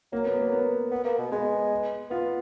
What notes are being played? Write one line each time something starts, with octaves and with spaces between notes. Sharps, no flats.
F#3 A#3
B3
A#3
B3
B3
A#3
B2
G#3 B3
B3 F4